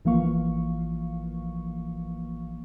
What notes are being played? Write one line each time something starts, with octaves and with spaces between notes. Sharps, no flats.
A1 E3 F3 A#3 F5 C#6